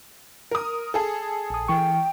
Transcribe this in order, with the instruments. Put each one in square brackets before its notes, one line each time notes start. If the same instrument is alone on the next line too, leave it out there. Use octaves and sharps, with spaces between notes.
[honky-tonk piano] A#4 D#6
G#4 A4
[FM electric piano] A#1 D#6
[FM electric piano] E3 C#6 [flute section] G5